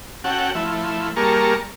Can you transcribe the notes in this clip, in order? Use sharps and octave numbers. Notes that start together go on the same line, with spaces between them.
C#4 F#4 A4 F#5 G5
F3 A3 E4
G3 A#3 G#4 A#4 A5 C#6